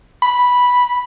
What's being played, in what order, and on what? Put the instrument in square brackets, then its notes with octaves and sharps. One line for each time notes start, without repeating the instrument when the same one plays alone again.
[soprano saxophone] B5